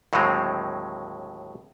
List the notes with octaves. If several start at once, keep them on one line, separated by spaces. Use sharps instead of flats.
D#2 A2 D3 F#3 G#3 C4